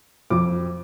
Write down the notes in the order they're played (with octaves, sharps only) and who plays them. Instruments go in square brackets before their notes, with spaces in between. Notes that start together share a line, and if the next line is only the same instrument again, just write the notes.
[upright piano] F2 D6